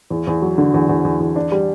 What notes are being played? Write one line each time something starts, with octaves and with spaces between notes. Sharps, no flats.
E2
E2
F#3
D3
E2
E2
E2
E2
D4
G3